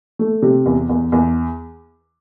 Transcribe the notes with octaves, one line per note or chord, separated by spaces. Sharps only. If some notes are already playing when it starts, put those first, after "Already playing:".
A3
C3
E2
E2
E2